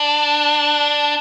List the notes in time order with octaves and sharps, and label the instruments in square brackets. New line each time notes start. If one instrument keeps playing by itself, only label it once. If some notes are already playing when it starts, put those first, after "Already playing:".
Already playing: [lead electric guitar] D4